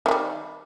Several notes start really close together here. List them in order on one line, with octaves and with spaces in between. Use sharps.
D#3 A3 G3